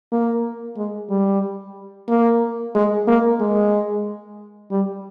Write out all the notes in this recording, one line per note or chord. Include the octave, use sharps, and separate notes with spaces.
A#3
G#3
G3
A#3
G#3
A#3
G#3
G3